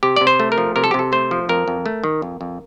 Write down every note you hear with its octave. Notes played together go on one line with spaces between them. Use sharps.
C3 G4
C3 D5
C5
A3
A#4
F3
C3 A#4
A4
G4
C3 A4
A3 C5
F3
F2 A#4
F2
A3
D#3
F2
F2